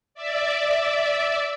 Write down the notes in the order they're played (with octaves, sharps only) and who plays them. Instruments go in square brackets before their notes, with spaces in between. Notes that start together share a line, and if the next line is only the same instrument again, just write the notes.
[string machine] D5 E5